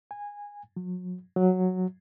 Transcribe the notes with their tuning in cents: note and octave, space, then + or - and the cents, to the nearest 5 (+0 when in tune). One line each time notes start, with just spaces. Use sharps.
G#5 -15
F#3 -35
F#3 -5